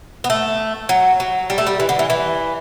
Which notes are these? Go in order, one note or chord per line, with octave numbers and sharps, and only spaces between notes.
B3
A3
F#3
F#3
G3
A3
G3
E3
D3
E3
E3